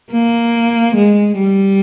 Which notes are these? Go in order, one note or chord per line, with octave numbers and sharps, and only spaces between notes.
A#3
G#3
G3